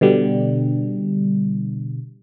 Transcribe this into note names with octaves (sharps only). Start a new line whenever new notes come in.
B2 D3 G3